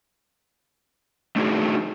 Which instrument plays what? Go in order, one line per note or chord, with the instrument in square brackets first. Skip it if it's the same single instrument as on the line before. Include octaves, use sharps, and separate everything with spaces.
[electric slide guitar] A3 D4 D#4 F4 F#4 G#4